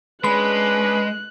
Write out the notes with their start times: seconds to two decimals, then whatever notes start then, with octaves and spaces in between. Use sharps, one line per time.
0.24 G#3 C#4 D4 B4 B5 F#6